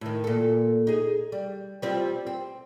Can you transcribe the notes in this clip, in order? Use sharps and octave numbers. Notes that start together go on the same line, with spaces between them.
A2 D#3
A#2 A4
D#4 G#4
G3
G3 C4 F4
C4